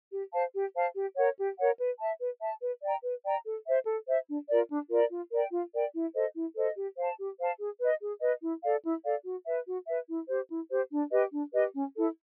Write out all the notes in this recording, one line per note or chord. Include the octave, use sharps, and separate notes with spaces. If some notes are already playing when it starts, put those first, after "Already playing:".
G4
C5 F5 A5
G4
C5 F5 A5
G4
A#4 C#5 F#5
G4
A#4 C#5 F#5
B4
E5 A5
B4
E5 A5
B4
D5 G5 A#5
B4
D5 G5 A#5
A4
C5 E5
A4
C5 E5
D4
F4 A#4 D5
D4
F4 A#4 D5
F4
A#4 D5 G5
F4
A#4 D5 G5
E4
A4 C5 D#5
E4
A4 C5 D#5
G4
C5 F5 A5
G4
C5 F5 A5
G#4
B4 D#5
G#4
B4 D#5
E4
A4 D5 F5
E4
A4 D5 F5
F#4
B4 E5
F#4
B4 E5
E4
G4 C5
E4
G4 C5
D4
G4 B4 D#5
D4
G4 B4 D#5
C#4
E4 A4